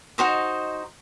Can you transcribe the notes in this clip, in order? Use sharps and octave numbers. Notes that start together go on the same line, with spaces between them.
D#4 F#4 C5 D#5